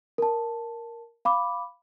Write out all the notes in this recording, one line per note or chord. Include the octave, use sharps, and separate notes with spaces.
A#4 A5
F5 B5 D6